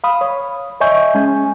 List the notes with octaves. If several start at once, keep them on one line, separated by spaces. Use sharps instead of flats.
F5 B5 D#6
C#5
C#5 D#5 E5 G#5 C#6 G6
G#3 C#4 G#5